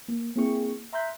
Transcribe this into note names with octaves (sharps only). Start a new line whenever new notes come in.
A#3
A#3 C4 E4 G#4 G5 C#6
E5 A#5 C6 F#6 G6 B6